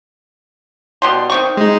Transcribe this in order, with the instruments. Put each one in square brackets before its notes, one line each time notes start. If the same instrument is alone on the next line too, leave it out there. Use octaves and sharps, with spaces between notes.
[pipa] B2 G3 C6
D#3 C4 C#6
[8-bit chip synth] G#3 D#4